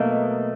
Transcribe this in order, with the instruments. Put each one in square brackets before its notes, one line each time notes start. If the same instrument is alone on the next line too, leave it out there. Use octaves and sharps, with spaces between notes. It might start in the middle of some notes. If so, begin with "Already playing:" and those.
Already playing: [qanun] B2 F#3 A#3 D#4 [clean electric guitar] A3